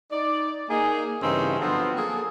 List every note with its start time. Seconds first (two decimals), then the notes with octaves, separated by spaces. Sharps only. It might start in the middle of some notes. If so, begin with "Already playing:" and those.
0.12 D#4 D5
0.70 A#3 D#4 G#4
1.22 G2 C#3 E3 C4 C#4 D#4
1.60 D3 F3 F#3 B3 C4 F4
1.97 A#3 G#4 A4